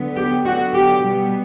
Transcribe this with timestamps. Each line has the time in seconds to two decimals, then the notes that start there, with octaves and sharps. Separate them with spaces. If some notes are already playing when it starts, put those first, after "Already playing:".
Already playing: D3 F#3 B3
0.16 G4
0.45 D3 F#3 B3 F#4
0.74 G4
1.03 B2 G3 B3